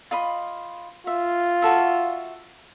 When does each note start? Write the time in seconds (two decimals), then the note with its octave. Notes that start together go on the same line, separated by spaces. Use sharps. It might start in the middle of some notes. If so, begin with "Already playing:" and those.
0.11 F4 D#5 B5
1.07 F4 E5
1.62 F#4 A4 E5